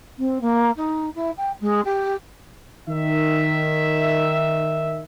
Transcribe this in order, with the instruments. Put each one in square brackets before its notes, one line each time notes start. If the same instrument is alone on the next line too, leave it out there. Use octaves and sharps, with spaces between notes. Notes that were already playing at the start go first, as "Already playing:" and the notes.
[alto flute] C4
A#3
D#4
E4
G5
G#3
G4
[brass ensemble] D#3 E5